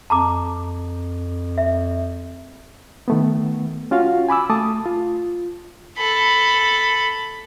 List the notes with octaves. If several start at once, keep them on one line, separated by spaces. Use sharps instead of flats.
F2 A5 A#5 D6
E5
D#3 A3 B3
C#4 F4 F#4 F5
G#5 B5 D6 E6
A3 A5 D6 D#6
F4
A4 B5